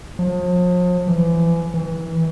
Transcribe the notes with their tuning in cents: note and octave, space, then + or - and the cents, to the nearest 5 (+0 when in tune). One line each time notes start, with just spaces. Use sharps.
F3 +40
E3 +30
E3 -20